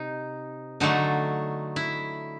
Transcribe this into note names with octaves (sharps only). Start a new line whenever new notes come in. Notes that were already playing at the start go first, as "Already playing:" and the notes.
Already playing: C3 D#4
D3 F#3 A3 D#4
E4